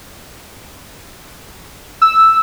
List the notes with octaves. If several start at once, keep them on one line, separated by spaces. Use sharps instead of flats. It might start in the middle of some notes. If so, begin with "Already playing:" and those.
E6